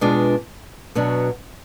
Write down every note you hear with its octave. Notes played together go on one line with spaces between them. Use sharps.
B2 G#3 B3 D4 F4
B2 F#3 B3 D4